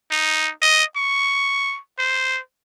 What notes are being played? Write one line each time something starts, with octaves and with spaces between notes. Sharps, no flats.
D#4
D#5
C#6
C5